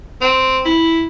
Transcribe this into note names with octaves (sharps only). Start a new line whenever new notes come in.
C4
E4